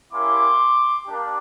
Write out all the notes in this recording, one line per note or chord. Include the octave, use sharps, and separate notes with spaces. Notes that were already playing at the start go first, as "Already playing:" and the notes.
A#3 C#4 E4 G4 C6 D6
A#3 D4 G4